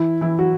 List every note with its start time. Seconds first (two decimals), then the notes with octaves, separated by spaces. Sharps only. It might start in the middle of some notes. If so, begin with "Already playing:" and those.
Already playing: E3 E4
0.21 E3 E4
0.39 F#3 F#4